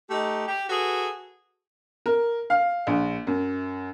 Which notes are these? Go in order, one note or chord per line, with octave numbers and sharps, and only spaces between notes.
A3 D#4 G4
G4
F#4 G#4 A4 B4
A#4
F5
A#1
F#2